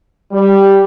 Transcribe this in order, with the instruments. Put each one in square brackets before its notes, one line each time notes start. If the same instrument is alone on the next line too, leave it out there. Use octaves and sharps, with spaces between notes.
[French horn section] G3